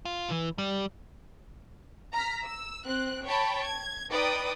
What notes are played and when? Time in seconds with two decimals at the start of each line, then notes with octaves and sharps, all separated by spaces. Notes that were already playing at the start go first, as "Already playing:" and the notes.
0.05 F4
0.30 E3
0.58 G3
2.13 A#5 F6 B6
2.43 E6
2.85 C4 F#6
3.25 C#5 G5 A5 B5
3.63 G#6
4.10 D#4 B4 D5 G5 D#6